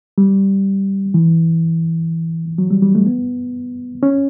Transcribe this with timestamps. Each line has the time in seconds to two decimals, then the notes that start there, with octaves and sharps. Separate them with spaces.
0.18 G3
1.14 E3
2.58 F#3
2.70 G3
2.82 G3
2.95 A3
3.06 B3
4.03 C#4